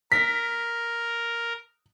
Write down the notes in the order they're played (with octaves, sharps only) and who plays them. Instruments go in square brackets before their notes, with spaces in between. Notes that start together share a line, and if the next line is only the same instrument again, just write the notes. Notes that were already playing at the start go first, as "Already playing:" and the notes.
[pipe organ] A#4 [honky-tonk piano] B6